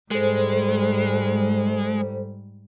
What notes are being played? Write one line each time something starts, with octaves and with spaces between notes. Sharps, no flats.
G#2 G3 G#3 A4 C5